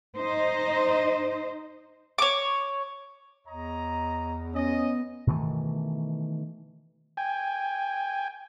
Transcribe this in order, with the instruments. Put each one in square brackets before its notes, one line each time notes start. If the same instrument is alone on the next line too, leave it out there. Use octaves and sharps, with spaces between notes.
[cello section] D#4 C5 D#5
[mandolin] C#5 D6
[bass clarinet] E2 [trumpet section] C#5 D#5 A#5
[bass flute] B3 [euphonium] C#4 [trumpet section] D#5
[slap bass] B2 D#3 E3 A3
[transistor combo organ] G5 G#5